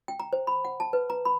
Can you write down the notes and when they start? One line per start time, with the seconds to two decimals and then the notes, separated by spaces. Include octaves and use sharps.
0.08 G5
0.20 A#5
0.33 C5
0.47 B5
0.65 F#5
0.80 A5
0.93 B4
1.10 A#5
1.25 B5